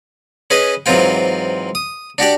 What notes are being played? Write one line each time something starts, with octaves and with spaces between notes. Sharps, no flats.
C#4 G#4 B4 D#5
G#2 E3 F#3 C4 F4 G5
D#6
D4 F#4 G4 D5